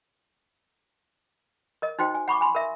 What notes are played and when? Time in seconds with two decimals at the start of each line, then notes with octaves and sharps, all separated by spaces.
1.82 A#4 D#5
1.99 D#4 F#4 C5 G5
2.14 G#5
2.28 F#5 B5 C#6 D6
2.41 G#5 B5 C6
2.55 A#4 E5